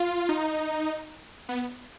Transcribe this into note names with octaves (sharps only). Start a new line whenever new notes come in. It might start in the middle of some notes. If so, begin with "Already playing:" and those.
Already playing: F4
D#4
B3